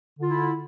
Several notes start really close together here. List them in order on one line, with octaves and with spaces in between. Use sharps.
D3 F4 E4